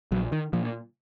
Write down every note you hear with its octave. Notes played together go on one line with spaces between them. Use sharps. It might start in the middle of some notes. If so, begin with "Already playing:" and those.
A#1 F#3
D#3
A#2 F3